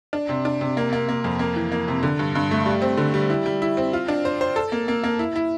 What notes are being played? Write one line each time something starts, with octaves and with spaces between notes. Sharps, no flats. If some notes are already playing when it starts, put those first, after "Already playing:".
D4
C3
D4
C3
A#3
A#3
A#3
F2
A#3
E3
A#3
C3
D3
G2
G2
A3
G3
C4
D3
G3
E4
G3
E4
C4
F4
D4
C5
C5
A4
A#3
A#3
A#3
E4
E4